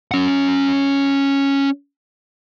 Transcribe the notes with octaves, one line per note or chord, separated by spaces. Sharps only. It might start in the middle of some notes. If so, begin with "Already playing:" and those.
C#4 F#5